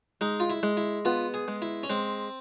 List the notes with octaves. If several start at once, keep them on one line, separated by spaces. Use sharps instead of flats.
G#3 D#4
F4
E4
G#3
E4
B3 F4
G#4
G#3
E4
C#4
G#3 C4